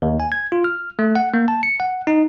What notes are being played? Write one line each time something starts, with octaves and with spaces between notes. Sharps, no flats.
D#2
G#5
G#6
F4
F6
A3
F#5
A#3
A5
C#7
F#5
D#4